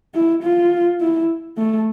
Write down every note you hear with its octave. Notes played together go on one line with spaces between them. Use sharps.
E4
F4
E4
A3